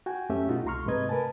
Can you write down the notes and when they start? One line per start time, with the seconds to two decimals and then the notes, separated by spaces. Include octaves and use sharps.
0.06 F#4 G5 G#5
0.29 F#2 A3 C#4 G4 E5
0.49 B2 D#4 F4 F#4
0.65 C2 A3 A#5 C6 C#6 F6
0.86 G#2 C3 A3 B4 D#5 G#6
1.09 A#4 B4 G#5 A5